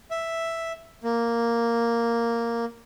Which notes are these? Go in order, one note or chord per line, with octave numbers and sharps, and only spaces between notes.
E5
A#3